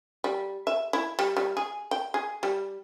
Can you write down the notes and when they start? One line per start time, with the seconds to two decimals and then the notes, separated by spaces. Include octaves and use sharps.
0.24 G3
0.67 E5
0.93 E4
1.19 G3
1.37 G3
1.57 G#4
1.91 G5
2.14 G#4
2.43 G3